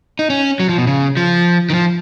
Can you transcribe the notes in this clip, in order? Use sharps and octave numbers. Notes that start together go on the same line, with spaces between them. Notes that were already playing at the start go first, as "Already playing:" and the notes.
D#4
C#4
F#3
F3
B2
C#3
F3
D#3
F3